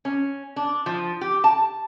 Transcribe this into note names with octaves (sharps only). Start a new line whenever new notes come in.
C#4
D4
F3
G4
A5